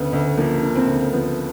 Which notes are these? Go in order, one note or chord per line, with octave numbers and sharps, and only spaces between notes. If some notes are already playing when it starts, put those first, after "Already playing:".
Already playing: D2 C#3 B3
D2
F3 A#3
C#3
C4
D2
F3 B3